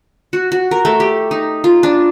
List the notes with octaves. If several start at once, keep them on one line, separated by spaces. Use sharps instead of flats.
F#4
F#4
A#4
A3
G4
D#4
F4
D4